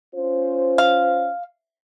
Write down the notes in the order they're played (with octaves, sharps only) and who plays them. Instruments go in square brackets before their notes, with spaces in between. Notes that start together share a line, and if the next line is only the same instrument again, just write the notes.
[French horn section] C#4 F4 C5
[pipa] F5